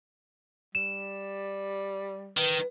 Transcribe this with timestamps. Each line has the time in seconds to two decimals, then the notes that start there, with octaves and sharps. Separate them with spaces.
0.75 G3 E7
2.37 D#3 B4